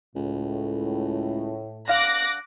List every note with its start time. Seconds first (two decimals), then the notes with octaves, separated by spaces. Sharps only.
0.15 C#2 A2
1.88 D3 F5 D6 F#6 A#6